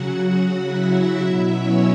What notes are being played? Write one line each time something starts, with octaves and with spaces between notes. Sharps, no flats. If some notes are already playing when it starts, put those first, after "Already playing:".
Already playing: C#3 F#3 F#4 F#5
E4 E5
B2 F#3 E4 E5
C#4 C#5